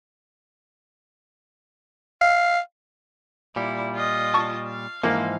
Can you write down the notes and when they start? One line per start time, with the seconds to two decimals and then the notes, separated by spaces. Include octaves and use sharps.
2.21 F5
3.56 A#2 G3 E4
3.94 F4 D#5
4.34 A5 C#6
4.67 F5
5.03 G#2 E3 F3 A#3